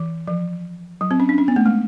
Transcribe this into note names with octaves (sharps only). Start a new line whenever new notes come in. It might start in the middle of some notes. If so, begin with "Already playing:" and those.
Already playing: E3
F3
F#3
C4
C#4
D4
C#4
B3
A3
G#3